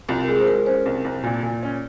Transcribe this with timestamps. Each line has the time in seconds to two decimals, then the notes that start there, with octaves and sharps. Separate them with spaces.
0.09 C2 F4
0.23 A#4
0.28 G#3 G#4
0.39 C5
0.47 G#3 A#4
0.66 C#4 C5
0.86 C2
1.05 C2
1.23 A#2
1.43 A#2
1.63 C#4